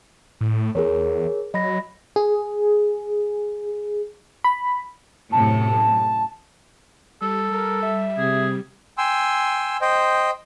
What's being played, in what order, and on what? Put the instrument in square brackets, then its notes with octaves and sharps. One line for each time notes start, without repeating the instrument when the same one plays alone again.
[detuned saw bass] A2
[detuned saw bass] E2 [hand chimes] G#4 A#4 C#5
[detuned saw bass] F#3 [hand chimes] D#5 B5 A#6
[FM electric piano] G#4
B5
[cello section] F#2 A2 C3 [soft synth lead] A5
[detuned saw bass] G3 [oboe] A4
[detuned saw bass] G3 [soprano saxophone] A#4
[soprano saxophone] E5
[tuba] C3 [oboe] G#4
[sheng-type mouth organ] G5 G#5 C6 E6
C5 D#5 G5